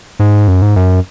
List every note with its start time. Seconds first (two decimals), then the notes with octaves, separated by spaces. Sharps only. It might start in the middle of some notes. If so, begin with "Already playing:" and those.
0.20 G#2
0.48 F#2
0.62 G#2
0.76 F#2